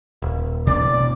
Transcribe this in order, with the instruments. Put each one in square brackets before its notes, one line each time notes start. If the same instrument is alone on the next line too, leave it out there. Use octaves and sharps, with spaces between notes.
[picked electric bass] D#1
[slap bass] A1 B2 D4 [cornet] D5